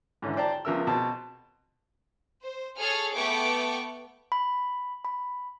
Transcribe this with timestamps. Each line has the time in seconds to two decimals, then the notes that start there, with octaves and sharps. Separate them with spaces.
0.22 G#2 D3 E3 C#4
0.36 C5 D5 G5 A5 A#5
0.52 G5
0.65 C#2 F3 B3 A#4 E5 E6
0.87 B2 C4 A5
2.43 C5
2.78 G#4 A4 C#5 F6
3.14 A3 B3 G5 C#6 D6
4.32 B5
5.05 B5